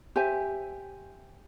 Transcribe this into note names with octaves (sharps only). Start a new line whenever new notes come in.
G4 C5 E5 G#5